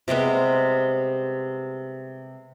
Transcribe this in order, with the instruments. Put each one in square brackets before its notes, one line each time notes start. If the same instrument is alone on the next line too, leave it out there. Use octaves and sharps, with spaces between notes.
[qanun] C3 G3 G#3 B3